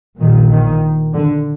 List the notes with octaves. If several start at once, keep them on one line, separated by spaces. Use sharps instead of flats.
A#1 A#2 D#3
D#3
D3